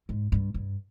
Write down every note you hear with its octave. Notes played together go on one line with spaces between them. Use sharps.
G#2
G2
G2